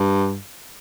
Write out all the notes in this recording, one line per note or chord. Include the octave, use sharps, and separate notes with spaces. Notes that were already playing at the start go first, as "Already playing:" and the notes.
Already playing: G2